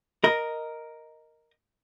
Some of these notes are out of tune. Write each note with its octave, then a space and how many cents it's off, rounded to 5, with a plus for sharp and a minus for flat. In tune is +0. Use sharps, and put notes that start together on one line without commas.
A#4 +0 D#5 +0